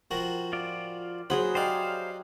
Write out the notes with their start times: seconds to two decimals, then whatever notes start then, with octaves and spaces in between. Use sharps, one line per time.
0.11 F3 F#4 A#4 G5
0.53 F4 D5
1.30 F#3 G#4 C5 F#5 B5
1.55 D#4 G4 C5 D5 F5 G5